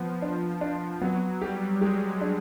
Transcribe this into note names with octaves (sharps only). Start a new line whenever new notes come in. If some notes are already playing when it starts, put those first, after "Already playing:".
Already playing: F3 B3
D4
D4
F#3 B3
G3 G4
G#3 G4
D4